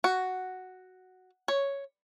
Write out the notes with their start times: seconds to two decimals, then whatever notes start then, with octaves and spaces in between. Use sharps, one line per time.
0.04 F#4
1.48 C#5